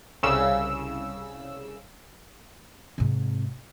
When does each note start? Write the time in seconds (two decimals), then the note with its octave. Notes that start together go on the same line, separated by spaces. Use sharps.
0.23 C2 C#3 E6
2.98 G#2 C3